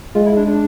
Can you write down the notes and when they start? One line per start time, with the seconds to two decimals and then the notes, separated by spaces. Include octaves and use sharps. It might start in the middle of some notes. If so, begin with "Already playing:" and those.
0.15 G#3 F4
0.26 E4
0.37 D4
0.47 D4